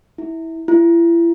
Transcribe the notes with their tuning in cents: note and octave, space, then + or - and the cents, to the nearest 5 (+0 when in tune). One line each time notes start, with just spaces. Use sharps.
E4 -15
E4 +35